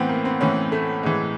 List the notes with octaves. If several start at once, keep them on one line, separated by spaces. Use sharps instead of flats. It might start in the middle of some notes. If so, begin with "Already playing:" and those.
Already playing: A2 E3 B3 C4
A#3
C4
A2 E3 C#4
A3
A2 E3 G#3